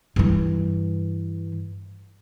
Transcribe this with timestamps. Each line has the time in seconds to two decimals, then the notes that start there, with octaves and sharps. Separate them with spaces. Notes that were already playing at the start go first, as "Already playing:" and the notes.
0.16 G2 E3